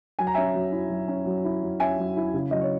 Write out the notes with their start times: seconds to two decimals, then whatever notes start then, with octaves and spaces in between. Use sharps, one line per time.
0.19 F#3 G#5
0.27 A#5
0.34 C#4 E5 G#5
0.55 F#3
0.72 E4
0.90 F#3
1.08 C#4
1.26 F#3
1.45 E4
1.63 F#3
1.80 C#4 E5 G#5
1.99 F#3
2.17 E4
2.34 C#3
2.51 F#3 D#5
2.61 C#5